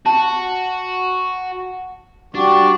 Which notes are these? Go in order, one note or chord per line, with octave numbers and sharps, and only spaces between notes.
F#4 A5
G3 D4 F#4 G4